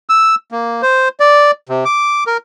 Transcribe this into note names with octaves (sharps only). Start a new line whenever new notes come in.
E6
A#3
C5
D5
C3
D6
A#4